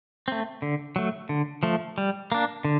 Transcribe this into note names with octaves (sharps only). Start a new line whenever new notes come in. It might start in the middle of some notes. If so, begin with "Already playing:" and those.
A3 C4
D3
F#3 A3
D3
F3 A3
G3
A#3 D4
D3